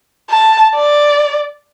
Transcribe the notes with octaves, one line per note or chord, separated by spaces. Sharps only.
A5
D5